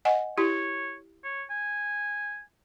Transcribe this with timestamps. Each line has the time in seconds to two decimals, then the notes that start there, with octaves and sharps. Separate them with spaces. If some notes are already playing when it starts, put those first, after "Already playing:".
0.05 D#5 F#5 G#5
0.38 E4 G4 C#5
1.24 C#5
1.50 G#5